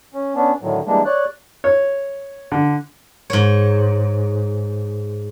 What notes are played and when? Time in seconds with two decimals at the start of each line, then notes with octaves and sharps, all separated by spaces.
0.14 C#4
0.35 B3 C#4 D4
0.62 A2 D3 D#3 F#3
0.87 E3 G3 G#3 A#3 D4
1.05 C#5 D5 F#6
1.64 C#5
2.52 D3
3.30 G#2 C#5